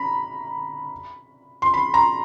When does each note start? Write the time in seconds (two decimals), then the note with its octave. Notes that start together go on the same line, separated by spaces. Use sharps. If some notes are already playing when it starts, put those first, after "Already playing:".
Already playing: A#5 B5
1.62 C6
1.74 B5
1.94 A#5